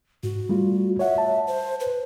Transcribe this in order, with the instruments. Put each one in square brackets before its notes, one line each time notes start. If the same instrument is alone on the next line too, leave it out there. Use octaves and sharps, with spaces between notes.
[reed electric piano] G#2 [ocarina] F#4
[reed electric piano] G3 A3 F4
[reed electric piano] C#5 F#5 [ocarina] E5
[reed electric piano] A5
[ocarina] C5
B4